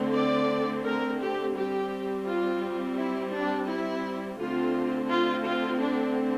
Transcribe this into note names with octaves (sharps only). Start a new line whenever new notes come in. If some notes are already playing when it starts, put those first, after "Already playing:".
Already playing: D3 A3 C4
D5
A#4
G4
G3 C4 G4
F4
E4
D4
E4
D3 A3 C4 F4
F4
F4
D4